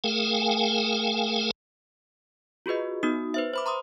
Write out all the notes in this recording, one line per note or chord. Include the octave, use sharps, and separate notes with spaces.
A3 G#4 A#4 F5 G5 G#5
F4 F#4 G#4 B4 D#5
B3 D#4 F#4 D#6
B4 C5 E5
C5 B5 D6
A#5 C6 D6 D#6